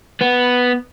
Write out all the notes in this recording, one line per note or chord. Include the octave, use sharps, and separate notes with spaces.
B3